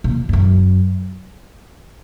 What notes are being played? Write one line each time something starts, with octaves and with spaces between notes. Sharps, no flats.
A#2
G#2
F#2